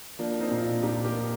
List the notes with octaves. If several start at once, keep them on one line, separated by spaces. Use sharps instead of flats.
F3 A#3 D4
C4 D#4
A#2
D4 F4
A#2 D#4 G4
G4 A#4
F3